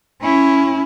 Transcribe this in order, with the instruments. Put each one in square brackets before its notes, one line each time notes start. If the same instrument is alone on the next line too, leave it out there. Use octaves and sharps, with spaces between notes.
[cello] C#4 E4